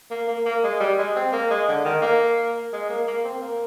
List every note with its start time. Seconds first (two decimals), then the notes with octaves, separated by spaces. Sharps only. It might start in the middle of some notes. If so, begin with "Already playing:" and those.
0.11 A#3
0.28 A#3
0.46 A#3
0.64 G#3
0.80 G3
0.98 G#3
1.16 C4
1.33 A#3
1.51 G#3
1.68 D3
1.85 D#3
2.02 A#3
2.73 G#3
2.89 A#3
3.07 A#3
3.25 C4
3.41 A#3